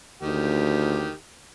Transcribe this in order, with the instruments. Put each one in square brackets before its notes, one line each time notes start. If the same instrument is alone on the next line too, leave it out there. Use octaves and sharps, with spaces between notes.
[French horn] D2 [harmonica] D#3 G4